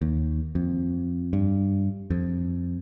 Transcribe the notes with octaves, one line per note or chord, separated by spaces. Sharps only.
D#2
F2
G2
F2